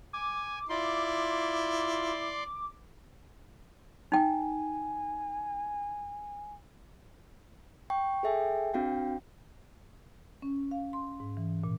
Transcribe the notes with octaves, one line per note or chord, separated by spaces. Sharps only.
G#5 D6
E4 F4 D5 C6
D#4 G5 G#5
G5 C#6
G#4 A4 E5 G5 G#5
C4 D4 F#4 F5 G5
C#4
F5
C6
G#2
E3
A#2